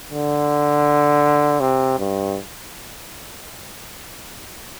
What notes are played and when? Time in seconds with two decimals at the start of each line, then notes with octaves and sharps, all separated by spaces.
0.11 D3
1.60 C3
1.99 G2